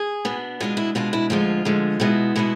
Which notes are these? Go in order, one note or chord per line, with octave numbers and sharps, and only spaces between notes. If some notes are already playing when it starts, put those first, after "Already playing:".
Already playing: G#4
B2 B3 D4
B2 G#3 D4 F4
E4
B2 G#3 D4 F4
E4
D2 D3 F3 G#3 F4
D2 D3 F3 G#3
B2 G#3 B3 E4
B2 G#3 B3 E4